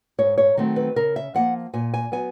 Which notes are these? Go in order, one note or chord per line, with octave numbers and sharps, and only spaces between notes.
G#2 C#5
C#5
D#3 F#3 A3 C4
B4
C#3 A#4
E5
F3 A#3 F#5
A#2 G#5
G#5
F#3 B3 G#5